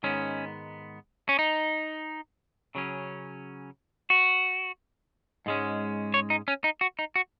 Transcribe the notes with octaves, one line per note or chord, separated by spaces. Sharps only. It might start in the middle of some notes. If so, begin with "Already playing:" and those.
G#2 D#3 G#3 B3 C#4
C#4
D#4
C#3 F#3 C#4
F#4
G#2 G#3 C#4
C#5
D#4
C#4
D#4
F#4
D#4
F#4